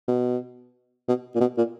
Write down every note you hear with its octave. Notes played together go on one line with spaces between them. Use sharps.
B2
B2
A#2
B2
A#2